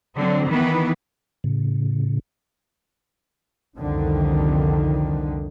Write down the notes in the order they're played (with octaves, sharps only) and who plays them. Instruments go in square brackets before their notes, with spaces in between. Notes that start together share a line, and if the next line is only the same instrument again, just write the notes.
[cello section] D3 F#3 C4
D#3 E3 B3 B4
[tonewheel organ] A2 C#3
[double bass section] C2 F2 D3 D#3